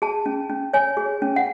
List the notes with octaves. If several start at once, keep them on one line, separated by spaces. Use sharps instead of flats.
G#4 A5
C#4
C#4
C#5 G#5
G#4
C#4
F#5